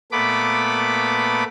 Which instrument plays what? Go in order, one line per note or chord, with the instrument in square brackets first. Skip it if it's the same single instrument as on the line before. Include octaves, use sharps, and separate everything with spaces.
[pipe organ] A#2 A3 B3 B5 D6